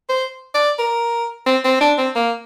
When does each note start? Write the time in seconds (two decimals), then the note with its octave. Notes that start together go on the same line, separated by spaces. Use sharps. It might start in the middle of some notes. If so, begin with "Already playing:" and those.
0.09 C5
0.54 D5
0.79 A#4
1.46 C4
1.64 C4
1.81 D4
1.98 C4
2.16 A#3